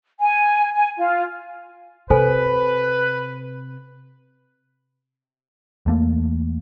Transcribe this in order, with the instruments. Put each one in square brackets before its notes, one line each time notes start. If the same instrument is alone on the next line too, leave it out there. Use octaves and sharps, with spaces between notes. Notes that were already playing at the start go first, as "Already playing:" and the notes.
[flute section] G#5
G#5
F4
[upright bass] C3 [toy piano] A4 C5 G#5 [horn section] B4
[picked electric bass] E2 A3 A#3